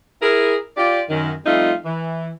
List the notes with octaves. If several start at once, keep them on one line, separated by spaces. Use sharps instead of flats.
E4 G#4 A#4
F4 G4 D5
F#2 D#3
F3 G3 A3 C4 D#4 F4
E3